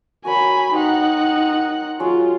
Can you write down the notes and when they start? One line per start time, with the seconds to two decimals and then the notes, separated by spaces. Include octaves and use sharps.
0.25 F#4 A#4 C#5 G#5 B5
0.73 D#4 C5 F#5 G5 A#5
2.00 F#3 G#3 C#4 F4